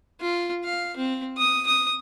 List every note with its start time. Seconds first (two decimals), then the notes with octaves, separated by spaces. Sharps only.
0.21 F4
0.64 F5
0.97 C4
1.37 D#6
1.66 D#6